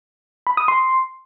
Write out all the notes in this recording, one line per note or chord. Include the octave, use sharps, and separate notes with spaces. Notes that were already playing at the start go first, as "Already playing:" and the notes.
B5
D#6
C6